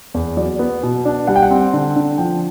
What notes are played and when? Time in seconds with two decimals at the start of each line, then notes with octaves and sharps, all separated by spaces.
0.14 E2
0.37 F#3 D5
0.59 B3
0.83 B2
1.05 D4
1.27 G3 F#5
1.36 G5
1.43 F#5
1.51 C4
1.73 D3
1.96 D3
2.18 F3 G5